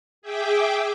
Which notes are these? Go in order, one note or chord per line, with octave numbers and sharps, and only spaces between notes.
G#4 E5 G5 D6